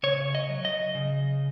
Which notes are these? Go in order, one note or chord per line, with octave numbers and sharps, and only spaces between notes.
C#3 C#5
D#5
F#3
D#5
C#3